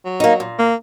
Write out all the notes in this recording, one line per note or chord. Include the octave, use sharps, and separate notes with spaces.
F#3
A#3 D#4
A#2
A#3